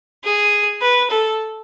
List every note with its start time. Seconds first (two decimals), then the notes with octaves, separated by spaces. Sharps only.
0.25 G#4
0.81 B4
1.10 A4